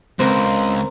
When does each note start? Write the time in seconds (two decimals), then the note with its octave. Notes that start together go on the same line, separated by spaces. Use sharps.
0.19 C#2 C4 A#4